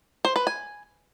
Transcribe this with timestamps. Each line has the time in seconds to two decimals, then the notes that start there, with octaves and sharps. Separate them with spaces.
0.25 C5
0.36 B4
0.47 G#5